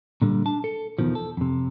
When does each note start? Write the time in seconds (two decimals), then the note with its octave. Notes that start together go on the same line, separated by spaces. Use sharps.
0.22 A#2 D3 G3
0.45 D4 A5
0.64 A4
0.99 E2 B2 D#3 F3
1.15 A4
1.37 F2 C3